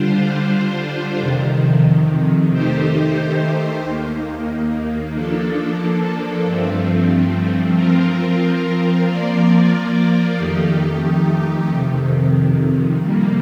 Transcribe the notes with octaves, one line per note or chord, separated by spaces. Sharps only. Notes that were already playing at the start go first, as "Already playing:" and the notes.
Already playing: D3 G3 D4 F4 C5
F2 C3 D#3
D#3 A3 D#4 G4 C5
D#2 D#3 A#3
F3 A#3 D4 A4
G2 F3 A3 C4
F3 C4 F4 A#4
F3 A#3 F4 A#4 D5
F2 D#3 A3 D#4 G4
F2 C3 D#3
F2 C3 G3 A#3